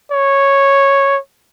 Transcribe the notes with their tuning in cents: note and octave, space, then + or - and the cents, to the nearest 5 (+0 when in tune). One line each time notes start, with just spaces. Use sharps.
C#5 -5